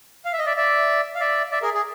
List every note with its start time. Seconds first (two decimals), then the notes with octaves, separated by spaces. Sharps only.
0.25 F5
0.33 E5
0.39 D#5
0.46 D5 E5
0.56 D5 E5
1.15 F5
1.20 D5 E5
1.51 D5 E5
1.62 G#4 A#4
1.74 G#4